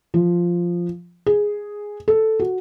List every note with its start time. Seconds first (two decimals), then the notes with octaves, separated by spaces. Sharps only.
0.14 F3
1.26 G#4
2.08 A4
2.40 F#4